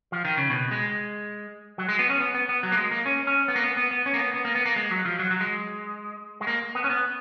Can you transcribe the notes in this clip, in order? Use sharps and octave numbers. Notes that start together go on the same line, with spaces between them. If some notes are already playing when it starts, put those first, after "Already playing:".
F3
D#3
C#3
B2
G#3
F#3
G#3
B3
C#4
B3
B3
B3
F#3
A#3
G#3
A#3
C#4
C#4
B3
A#3
B3
B3
B3
C#4
A#3
B3
B3
A#3
B3
A#3
G#3
F#3
F3
F#3
F#3
G#3
G#3
A#3
B3
C#4
B3